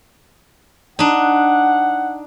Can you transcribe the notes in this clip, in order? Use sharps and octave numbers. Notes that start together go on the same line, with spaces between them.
D4 D#4 F#5